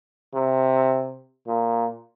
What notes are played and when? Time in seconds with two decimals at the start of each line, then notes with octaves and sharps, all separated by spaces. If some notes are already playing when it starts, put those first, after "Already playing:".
0.34 C3
1.47 A#2